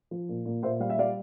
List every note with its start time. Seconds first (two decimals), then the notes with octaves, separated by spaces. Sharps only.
0.11 F3
0.29 A#2
0.46 A#2
0.63 A#2 C5 E5
0.80 G3 F5
0.90 E5
0.98 G3 D5 F5